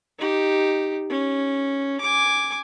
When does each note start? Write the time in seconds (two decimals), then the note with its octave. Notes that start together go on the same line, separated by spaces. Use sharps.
0.19 D#4 G4
1.10 C#4
2.00 G#5 D6